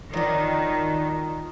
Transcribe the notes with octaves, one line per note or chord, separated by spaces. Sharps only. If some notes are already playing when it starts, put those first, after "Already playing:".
D#3 F#3 D4 F4 A#5 D#6